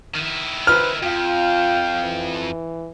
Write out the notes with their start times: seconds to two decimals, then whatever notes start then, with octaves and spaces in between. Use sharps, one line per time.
0.15 D#3 E4
0.67 B4 C5 F6
1.03 F2 F4 F5 G5
2.03 E3